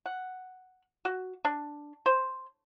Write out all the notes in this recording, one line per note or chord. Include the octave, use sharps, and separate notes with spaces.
F#5
F#4
D4
C5